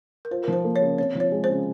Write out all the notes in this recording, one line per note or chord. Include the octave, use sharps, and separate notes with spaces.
A#4
F4 C5
F3 A#4
C5
A#3
C#5
C#3
C4 C#5
F3
C#5
G#3
C5
C#3